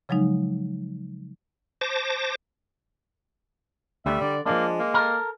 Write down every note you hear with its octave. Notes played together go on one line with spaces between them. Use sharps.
C#3 F3 F#3 G#3 D#4
C5 A5 D6 A#6
D2 D3 G3 E5
D3 D5
F3 G#3 A#3 D4
A#3
A4 A#4